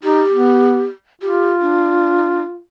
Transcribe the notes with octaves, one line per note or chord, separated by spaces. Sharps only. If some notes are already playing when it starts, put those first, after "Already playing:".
D#4 G4
B3
F4 G4
D4